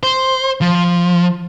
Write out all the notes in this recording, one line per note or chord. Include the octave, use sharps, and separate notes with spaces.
C5
F3